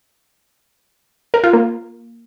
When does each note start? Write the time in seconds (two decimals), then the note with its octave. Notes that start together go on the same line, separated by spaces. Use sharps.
1.34 A#4
1.44 F4
1.53 A#3